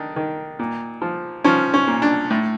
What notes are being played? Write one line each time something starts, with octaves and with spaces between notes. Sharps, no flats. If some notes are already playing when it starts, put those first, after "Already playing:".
Already playing: D#3 D4
D#3
A#2
F3
F3 C#4
C#4
A#2
D4
A2